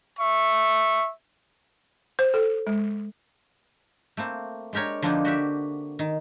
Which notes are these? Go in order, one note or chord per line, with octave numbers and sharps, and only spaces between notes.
E5 C#6
C5
A4
G#3
A3 A#3 C4
G#3 D4 G4 A#4 C#5
D3 F3 A#3 C4 D4 D#4
F#4 G4 E5
D#3